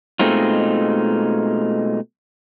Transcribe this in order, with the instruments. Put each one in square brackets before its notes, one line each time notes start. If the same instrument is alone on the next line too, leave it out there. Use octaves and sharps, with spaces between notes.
[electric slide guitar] B2 G#3 A3 C4 D#4 F4